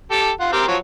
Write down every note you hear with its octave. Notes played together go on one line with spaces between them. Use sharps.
G4 A4
F4 F#5
C4 G4 A#4
F3 F#3 C#5